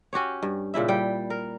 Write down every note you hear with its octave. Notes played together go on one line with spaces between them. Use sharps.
C#4 F#4 G4 C#5
G2
A#2 C#3 E4 E5
G3 G5
A#4